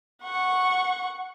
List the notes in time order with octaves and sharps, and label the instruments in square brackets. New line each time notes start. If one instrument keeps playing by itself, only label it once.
[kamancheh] F#5 C#6